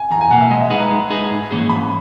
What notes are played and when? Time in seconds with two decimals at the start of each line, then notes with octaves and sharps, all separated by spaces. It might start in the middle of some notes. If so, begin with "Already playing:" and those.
Already playing: G#5
0.11 E2 A#5
0.21 G#5
0.31 B2 A#3 F#5
0.41 E5
0.51 G#3 D#5
0.61 E5
0.70 D#4 G#4 B4 F#5
0.80 A#5
0.91 G#3
1.10 D#4 G#4 B4
1.31 G#2
1.51 E3 A#3 C#4 G#4
1.69 G#2 B5